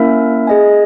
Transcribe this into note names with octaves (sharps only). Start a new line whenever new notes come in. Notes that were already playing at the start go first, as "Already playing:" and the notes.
Already playing: A#3 C#4 E4 A#4 E5
G#4 D#5 G#5